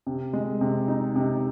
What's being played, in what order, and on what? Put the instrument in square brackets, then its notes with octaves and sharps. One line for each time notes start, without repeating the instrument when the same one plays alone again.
[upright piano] C3
G#3
C3
D#4
C3